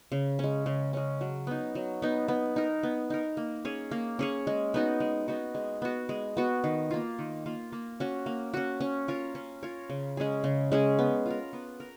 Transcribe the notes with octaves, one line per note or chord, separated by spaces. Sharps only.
C#3
G#3 C#4
C#3
G#3 C#4
F#3
B3 D#4
F#3
B3 D#4
B3
D#4 A#4
B3
D#4 A#4
A#3
C#4 G#4 C#5
A#3
C#4 G#4 C#5
G#3
B3 D#4 F#4
G#3
B3 D#4 F#4
G#3
B3 F#4
G#3
B3 F#4
D#3
A#3 F4
D#3
A#3 F4
A#3
C#4 F#4
A#3
C#4 F#4
C#4
F4 A#4 C#5
C#4
F4 A#4 C#5
C#3
G#3 C#4 G#4
C#3
G#3 C#4 G#4
B3
F4 A#4
B3
A#4